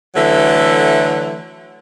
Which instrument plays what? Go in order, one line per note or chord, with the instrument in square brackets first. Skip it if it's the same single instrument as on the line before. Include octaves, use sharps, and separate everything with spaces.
[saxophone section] D3 E3 F#3 A3